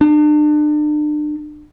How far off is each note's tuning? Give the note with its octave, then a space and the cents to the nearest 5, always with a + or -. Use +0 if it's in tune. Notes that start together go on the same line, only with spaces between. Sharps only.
D4 +35